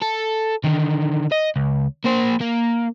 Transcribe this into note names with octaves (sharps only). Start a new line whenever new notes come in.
A4
D3 D#3
D#5
C#2
A#3 C5
A#3